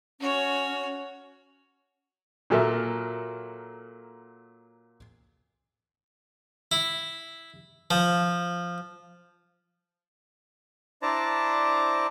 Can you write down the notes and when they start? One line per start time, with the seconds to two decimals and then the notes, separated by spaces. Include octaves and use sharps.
0.21 C#4 F#4 C#5
2.50 A#2 F#3 A4 A#4 E5
6.72 E4
7.91 F3
11.02 D4 E4 C5 D5 A5 A#5